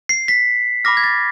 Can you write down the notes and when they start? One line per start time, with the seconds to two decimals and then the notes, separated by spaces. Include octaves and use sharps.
0.09 C7
0.28 B6
0.85 B5 D6 F6 A#6
0.97 G#6
1.04 A6